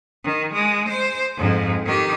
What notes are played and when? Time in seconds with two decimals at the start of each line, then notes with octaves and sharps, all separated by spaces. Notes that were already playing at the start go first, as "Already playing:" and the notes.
0.24 D#3
0.53 G#3
0.89 C5
1.37 F2 G#2
1.85 D#3 G4